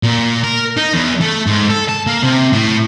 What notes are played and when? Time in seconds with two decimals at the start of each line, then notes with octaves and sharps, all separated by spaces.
0.03 A#2
0.44 A#4
0.77 D#4
0.93 E2
1.21 A3
1.47 G#2
1.70 A4
1.89 A5
2.07 A#3
2.22 C3
2.53 A2